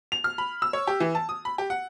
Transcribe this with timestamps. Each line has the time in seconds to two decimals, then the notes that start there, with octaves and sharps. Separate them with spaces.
0.12 F7
0.24 F6
0.38 B5
0.62 E6
0.73 C#5
0.87 G4
1.00 E3
1.15 A5
1.29 D#6
1.45 B5
1.58 G4
1.70 F#5